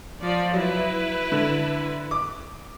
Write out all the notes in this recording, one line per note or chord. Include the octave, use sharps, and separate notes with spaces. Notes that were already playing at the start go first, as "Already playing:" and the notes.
F3 D5
F#3 E4 B4
D3
D6